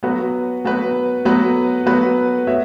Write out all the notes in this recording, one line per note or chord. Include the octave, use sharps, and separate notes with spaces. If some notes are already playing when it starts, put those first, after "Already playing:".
F#3 B3 F#4 B4
F#3 B3 F#4 B4
F#3 B3 F#4 B4
F#3 B3 F#4 B4
B3 F#4 C#5 E5